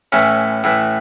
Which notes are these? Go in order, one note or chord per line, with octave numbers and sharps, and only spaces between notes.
A2 E3 C#4
A2 E3